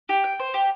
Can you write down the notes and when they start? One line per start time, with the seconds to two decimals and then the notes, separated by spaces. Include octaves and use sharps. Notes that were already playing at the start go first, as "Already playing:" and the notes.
0.09 G4
0.24 G5
0.40 C5
0.54 G4